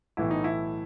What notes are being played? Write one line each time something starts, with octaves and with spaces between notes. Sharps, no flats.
B1 A2 E3 E4
D#4
E4